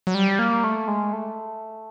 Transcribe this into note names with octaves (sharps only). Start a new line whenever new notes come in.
F#3
G3
A#3
A3
G#3
A3